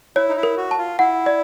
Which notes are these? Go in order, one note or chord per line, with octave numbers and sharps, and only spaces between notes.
E4 C#5
D#4
E4
A#4
F#4
A5
F4
E4 F#5
D5